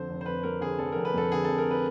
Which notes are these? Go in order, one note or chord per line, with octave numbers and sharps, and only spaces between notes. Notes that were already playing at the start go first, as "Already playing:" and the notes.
Already playing: F2 D3 C5
F1
C5
F1 B4
F2 A#4
D3 G#4
F1 A4
F1 A#4
B4
F2 A4
D3 G#4
A4
F1
A#4
B4